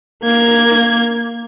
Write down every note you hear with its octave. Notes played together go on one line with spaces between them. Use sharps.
A#3 G#6